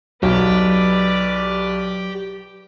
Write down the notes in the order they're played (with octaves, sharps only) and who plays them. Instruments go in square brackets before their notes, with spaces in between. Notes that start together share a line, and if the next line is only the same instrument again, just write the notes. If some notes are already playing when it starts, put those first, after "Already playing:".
[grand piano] B1 [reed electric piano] F#3 [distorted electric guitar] G4 [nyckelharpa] B4 D5